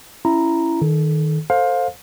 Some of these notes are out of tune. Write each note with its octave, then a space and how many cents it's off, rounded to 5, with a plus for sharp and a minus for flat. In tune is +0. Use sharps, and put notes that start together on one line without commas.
C#4 +0 E4 +15 A#5 +0
D#3 +0 A4 -35
A4 +25 C5 +10 F5 +20